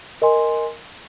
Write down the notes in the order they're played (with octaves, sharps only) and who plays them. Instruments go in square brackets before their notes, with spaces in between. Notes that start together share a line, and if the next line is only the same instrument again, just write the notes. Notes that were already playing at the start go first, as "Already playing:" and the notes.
[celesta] A#4 D#5 G#5 C6